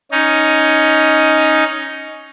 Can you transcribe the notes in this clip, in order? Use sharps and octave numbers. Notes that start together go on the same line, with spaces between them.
C#4 D#4